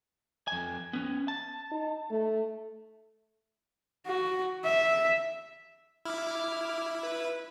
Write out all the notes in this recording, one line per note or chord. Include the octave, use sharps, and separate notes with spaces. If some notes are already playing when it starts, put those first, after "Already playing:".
F2 G#5
B3 C#4
A5
D#4
A3
F#4
E5
E4 D6 F6
B4